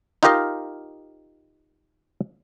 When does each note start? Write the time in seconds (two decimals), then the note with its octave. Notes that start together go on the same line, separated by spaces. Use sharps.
0.23 D#4 F4 G4 A#4 D#5 F5